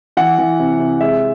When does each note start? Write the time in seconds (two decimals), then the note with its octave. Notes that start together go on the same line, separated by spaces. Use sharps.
0.17 E3 F#5
0.38 E3
0.59 C3
0.79 C3
1.01 G#3 E5